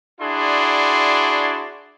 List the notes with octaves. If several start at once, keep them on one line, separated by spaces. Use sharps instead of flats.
D4 E4 F#4 G#4 D5 C6